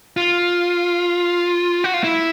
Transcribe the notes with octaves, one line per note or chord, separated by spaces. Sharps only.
F4
F#4
F4
E4